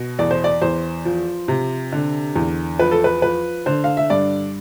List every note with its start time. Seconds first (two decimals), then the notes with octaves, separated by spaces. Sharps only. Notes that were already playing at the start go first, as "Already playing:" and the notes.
Already playing: B2
0.19 E2 D5
0.31 C5
0.44 D5
0.62 E2 C5
1.05 F3
1.48 C3
1.93 D3
2.36 E2
2.79 F3 B4
2.91 A4
3.04 B4
3.22 F3 B4
3.66 D3 C5
3.84 F5
3.97 E5
4.10 G2 D5